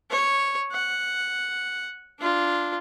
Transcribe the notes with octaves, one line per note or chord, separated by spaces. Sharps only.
C#5
F#5
D4 F4